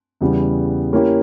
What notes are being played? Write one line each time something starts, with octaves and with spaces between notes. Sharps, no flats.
E2 C#3 E3 G3 B3
A#3 C#4 E4 G4